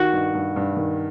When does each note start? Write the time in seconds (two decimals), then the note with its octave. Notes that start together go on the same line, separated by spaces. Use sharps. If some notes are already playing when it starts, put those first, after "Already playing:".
Already playing: D#3 F#4
0.13 G2
0.34 G2
0.56 G2
0.76 D#3